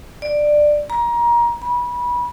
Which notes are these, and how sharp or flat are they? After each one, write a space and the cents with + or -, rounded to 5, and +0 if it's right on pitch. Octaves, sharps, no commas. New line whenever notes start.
D5 +15
A#5 +25
B5 -25